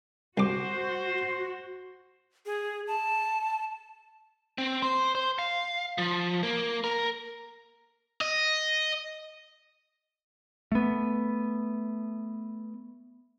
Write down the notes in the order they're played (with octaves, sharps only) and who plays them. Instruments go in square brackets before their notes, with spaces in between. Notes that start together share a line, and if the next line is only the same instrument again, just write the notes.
[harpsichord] C2 D6 [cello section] F#4 [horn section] C5
[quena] G#4
A5
[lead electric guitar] C4
C5
C5
F5
F3
A#3
A#4
[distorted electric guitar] D#5
[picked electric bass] A3 B3